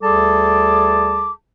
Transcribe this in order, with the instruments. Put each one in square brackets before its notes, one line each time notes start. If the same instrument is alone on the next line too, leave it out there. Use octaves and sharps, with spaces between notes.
[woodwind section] D2 G3 G#4 A4 A5 D6